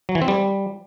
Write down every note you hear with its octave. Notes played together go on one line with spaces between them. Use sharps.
F#3
E3
C4
G3